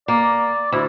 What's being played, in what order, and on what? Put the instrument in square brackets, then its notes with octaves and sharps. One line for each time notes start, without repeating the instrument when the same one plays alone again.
[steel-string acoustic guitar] A#3 [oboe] D5
[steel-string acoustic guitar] D2 [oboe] E4